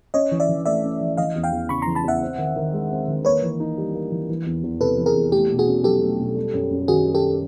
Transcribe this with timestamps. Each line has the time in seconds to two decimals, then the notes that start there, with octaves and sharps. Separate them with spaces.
0.14 C#4 C#5 D#5
0.31 E3
0.40 D5 E5
0.49 E3
0.66 A3 D5 E5
0.83 C#4
1.01 E3
1.17 E3 D#5 F5
1.35 E2
1.44 F5 G5
1.52 E2
1.69 C#3 B5 C#6
1.82 E3 A#5 C6
1.95 A5 B5
2.04 E2 E5 F#5
2.22 C4
2.38 D#3
2.56 D#3
2.73 G#3
2.90 C4
3.08 D#3
3.25 A#3 B4 C#5
3.43 E3
3.60 D#4
3.78 G3
3.94 A#3
4.12 E3
4.29 E3
4.46 E2
4.63 E2
4.80 C3 A4 B4
4.98 E3
5.06 G#4 A#4
5.15 E2
5.32 A3 G4
5.50 B2
5.59 F#4 G#4
5.67 C#4
5.84 F#3 G4 A4
6.02 A3
6.20 B2
6.36 G3
6.54 F#2
6.71 F#2
6.88 D#3 F#4 G#4
7.05 G3
7.15 G4 A4